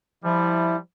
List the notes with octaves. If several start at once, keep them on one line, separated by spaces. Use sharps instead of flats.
F3 G3 E4